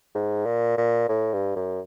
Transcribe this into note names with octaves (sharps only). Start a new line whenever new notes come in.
G#2
A#2
A#2
A2
G2
F#2